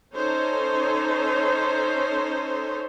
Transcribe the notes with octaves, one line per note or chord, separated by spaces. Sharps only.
C#4 D#4 A4 C5 C#5